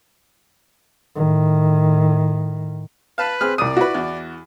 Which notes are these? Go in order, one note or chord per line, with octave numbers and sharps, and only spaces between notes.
A2 D#3
B4 F5 A5
C4 G#4 F6
C2 D5 D#6 D#7
E4 F#4 B4
E2